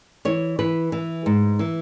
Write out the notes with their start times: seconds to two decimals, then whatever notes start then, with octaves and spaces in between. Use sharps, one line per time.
0.25 E3 C#5
0.59 E3 B4
0.92 E3
1.26 G#2
1.59 E3